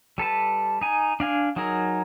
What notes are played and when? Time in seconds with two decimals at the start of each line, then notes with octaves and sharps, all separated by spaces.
0.18 G3 A4 B4 A5
0.81 D#4 G#5
1.20 D4 F5 G#5
1.56 F#3 D#4 G#4 A#4